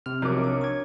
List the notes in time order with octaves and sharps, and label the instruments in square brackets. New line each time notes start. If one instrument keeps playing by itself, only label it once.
[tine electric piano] C3 C4 F6
[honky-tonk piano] B1 A#4 D6 [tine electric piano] C3 F3 F#6 [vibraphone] F#4 C#5
[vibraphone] D4 C#5
[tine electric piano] C#6 G#6